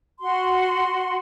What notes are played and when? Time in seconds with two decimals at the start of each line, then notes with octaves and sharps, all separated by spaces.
0.20 F#4 C6